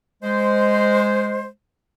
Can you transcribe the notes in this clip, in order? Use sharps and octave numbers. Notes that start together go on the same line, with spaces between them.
G#3 C5